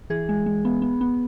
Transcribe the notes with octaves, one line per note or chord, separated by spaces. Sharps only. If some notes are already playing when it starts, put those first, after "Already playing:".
E3 G#4
G#3
G#3
B3
B3
B3